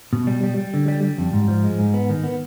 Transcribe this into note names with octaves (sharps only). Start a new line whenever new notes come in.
B2
G3
G3
G3
D3
G3
G3
F2
G#2
F3
G#3
G#2
B3
D#3
B3